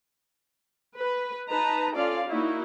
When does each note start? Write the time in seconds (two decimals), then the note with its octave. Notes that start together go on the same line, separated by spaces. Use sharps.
0.98 B4
1.49 D#4 B4 A5 A#5
1.95 C#4 F4 A4 D5 F5
2.27 A#3 D#4 E4 F#4